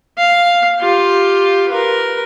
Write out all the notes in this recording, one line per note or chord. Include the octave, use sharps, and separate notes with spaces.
F5
F4 G4
A#4 B4